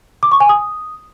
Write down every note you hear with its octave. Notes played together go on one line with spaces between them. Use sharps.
D6
C#6
G#5
D#6